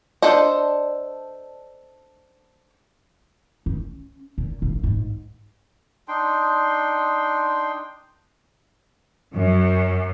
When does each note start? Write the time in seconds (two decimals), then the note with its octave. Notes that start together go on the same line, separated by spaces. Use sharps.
0.22 D4 A4 C5 D#5
3.66 C#4
4.38 A#2
4.62 A#1
4.83 G#2
6.08 D4 D#4 G5 C6
9.34 F#2